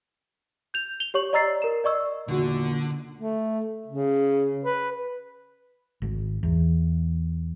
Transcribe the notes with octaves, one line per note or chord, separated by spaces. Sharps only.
G6 F7
F7 G7
G4 C#5 C#6 F#7
D5 D#5 A#5 E6 A6 C7
A#4 E7
D5 D#5 C#6 E6
E2 A#2 D3 D#3 F#4
A3
C#3
B4
G#1
E2